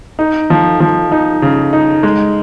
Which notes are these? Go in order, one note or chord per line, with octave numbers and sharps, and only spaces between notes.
D#4
F3
F3
D#4
C#3
D#4
G#3